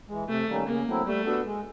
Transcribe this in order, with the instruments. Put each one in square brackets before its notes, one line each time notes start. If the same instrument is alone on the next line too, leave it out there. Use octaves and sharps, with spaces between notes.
[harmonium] E3 G#3
[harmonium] C3 [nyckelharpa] A3
[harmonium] D#3 G3 A#3 C#4
[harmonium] C#3 [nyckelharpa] A#3
[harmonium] F#3 A3 C4 E4
[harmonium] G3 [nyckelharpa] A3
[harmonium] B3 D4 F#4 A4
G#3